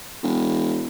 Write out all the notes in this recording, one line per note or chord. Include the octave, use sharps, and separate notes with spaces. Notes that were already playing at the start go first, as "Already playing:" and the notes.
E1